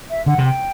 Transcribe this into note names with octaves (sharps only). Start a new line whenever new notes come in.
E5
D3 F#5
C3
G5